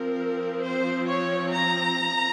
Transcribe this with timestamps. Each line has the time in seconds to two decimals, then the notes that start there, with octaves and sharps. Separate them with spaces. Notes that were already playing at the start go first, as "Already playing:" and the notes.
Already playing: F3 C4 A#4
0.63 C5
1.07 C#5
1.51 A#5